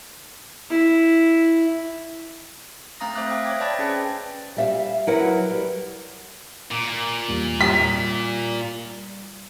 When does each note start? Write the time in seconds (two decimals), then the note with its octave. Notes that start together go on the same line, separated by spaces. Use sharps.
0.70 E4
3.00 A3 C4 F5 A#5 D#6 A#6
3.15 C5 E5 F5 D6 D#6 F#6
3.27 G5 D#6 F#6 A#6
3.45 C#5 E5 D6 G#6
3.60 C5 D5 A5 B5 A6 A#6
3.79 C#4 G#4 B4 G5
4.57 G3 E5 F5
5.07 F#3 E4 A#4 B4 F#5
5.50 G3
6.71 A#2
7.28 E2 G3 A#3
7.61 G3 B6